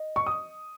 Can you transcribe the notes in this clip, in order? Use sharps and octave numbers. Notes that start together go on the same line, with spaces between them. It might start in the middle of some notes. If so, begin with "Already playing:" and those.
Already playing: D#5
C#6
D#6